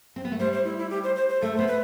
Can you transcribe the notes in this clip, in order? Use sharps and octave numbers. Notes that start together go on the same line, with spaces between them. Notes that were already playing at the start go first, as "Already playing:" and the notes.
C4
B3
A3
G3 C5
C5
E4
E4
G4
C5
C5
C5
A3 A4
B3 C5
B4